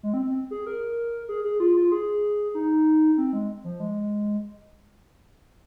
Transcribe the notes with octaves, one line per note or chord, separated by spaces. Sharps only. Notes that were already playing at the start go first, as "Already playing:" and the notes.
G#3
C4
C4
G#4
A#4
G#4
G#4
F4
F4
G#4
D#4
C4
G#3
F3
G#3